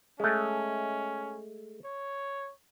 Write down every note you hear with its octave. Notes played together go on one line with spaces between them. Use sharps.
G#3 A3 C#4
C#5